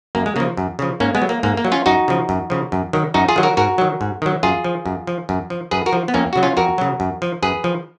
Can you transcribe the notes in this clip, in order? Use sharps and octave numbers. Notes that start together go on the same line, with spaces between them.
F#2 A#3
G#3
C#3 F3 A#3
F#2
C#3 F3
G#2 A#3 C#4
G#3 B3
F#3
A#3
G#2 A#3
A#3
F#3
C#4 F4
F#2 D#4 F#4
C#3 F3
F#2
C#3 F3
F#2
D#3 F#3
F#2 D#4 F#4
F4 G#4
D#3 F#3
F#4 A#4
G#2 F#4 A#4
D#3 F#3
G#2
D#3 F#3
F#2 F4 G#4
F3
F#2
F3
F#2
F3
F#2 G#4 B4
F#4 A#4
F3
B3
F2 A#3 C#4
C#3 F#3 F#4
C#4 F4
F2 F#4 A#4
C#3 F#3
F#2
F3
F#2 G#4 B4
F3